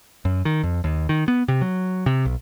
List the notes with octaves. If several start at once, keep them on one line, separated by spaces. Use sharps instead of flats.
F#2
D#3
F2
D#2
D#3
B3
C3
F#3
C3
B1